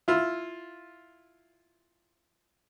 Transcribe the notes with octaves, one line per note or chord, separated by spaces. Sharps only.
E4 F4